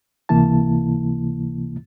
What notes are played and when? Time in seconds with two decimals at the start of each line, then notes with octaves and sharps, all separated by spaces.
0.29 C#2 C3 E3 A#3 E4 A5